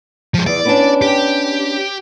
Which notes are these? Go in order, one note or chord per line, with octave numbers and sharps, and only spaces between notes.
F3 G#3
E2 D5
B3 C#4 D4
G4